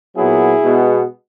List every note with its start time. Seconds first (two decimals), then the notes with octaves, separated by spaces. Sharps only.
0.15 A#2 F#3 B3 E4 G#4
0.63 B2 G#3 B3